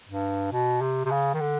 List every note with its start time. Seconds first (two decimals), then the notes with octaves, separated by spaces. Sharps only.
0.09 G2
0.52 B2
0.81 C3
1.05 C3
1.11 C#3
1.34 D#3
1.40 D3